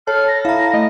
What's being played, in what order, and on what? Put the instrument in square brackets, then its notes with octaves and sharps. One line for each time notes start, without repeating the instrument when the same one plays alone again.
[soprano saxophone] A4 [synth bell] C#5 [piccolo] F6
[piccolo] A#6
[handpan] E4 [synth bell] F5 A#5
[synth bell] A3 [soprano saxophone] D#5